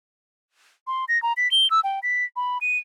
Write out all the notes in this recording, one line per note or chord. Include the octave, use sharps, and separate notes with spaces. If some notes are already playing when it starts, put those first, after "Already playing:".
C6
A#6
A#5
B6
G7
E6
G5
B6
B5
D#7